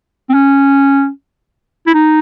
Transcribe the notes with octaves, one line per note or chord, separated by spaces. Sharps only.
C4
C#4
E4
D#4